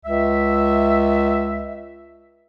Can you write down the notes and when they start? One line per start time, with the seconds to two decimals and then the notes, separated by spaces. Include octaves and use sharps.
0.05 C#2 E5